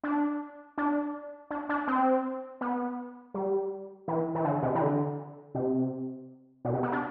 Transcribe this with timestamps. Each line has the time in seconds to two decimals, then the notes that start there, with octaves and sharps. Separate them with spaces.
0.03 D4
0.78 D4
1.50 D4
1.69 D4
1.87 C4
2.61 B3
3.34 G3
4.08 E3
4.35 E3
4.45 D3
4.62 C3
4.75 E3
4.81 D3
5.55 C3
6.65 B2
6.74 C3
6.83 B3
6.92 D4